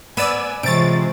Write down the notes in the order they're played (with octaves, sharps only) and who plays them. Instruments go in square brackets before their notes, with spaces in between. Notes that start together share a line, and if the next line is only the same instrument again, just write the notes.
[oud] B3 [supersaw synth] D5 E6 D#7 [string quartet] G#5
[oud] C3 C#5 [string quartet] E3 F3 G#3 [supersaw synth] A6 D7